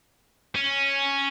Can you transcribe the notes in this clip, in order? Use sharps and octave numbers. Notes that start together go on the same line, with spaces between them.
C#4